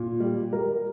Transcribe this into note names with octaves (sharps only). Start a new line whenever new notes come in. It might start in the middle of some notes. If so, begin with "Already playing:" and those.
Already playing: A#2
G3
G3 A#4